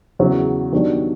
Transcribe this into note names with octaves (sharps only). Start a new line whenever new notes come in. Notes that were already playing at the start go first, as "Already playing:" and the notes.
E2 C#3 F#3
D#3 F#3 B3 D4 G4